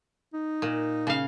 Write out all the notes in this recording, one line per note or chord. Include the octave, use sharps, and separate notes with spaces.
D#4
A#2
C#3 F5